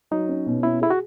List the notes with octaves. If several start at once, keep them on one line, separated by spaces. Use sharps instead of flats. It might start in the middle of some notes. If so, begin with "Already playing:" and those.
F#3 D#4
C#4
B2
C#4 E4
E4 G#4
F#4